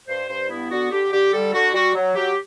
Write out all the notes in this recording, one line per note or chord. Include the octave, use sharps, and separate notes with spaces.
G2 C5
G2 C5
B3 E4
D3 F#4
D3 G4
D3 G4
G3 A4
D3 F#4
G3 F#4
F#3
F#3 G4